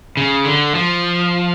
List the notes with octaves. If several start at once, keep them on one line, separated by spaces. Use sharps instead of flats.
C#3
D3
F3